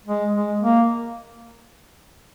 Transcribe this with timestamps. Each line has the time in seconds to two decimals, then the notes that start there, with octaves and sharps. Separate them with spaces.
0.06 G#3
0.34 G#3
0.61 A#3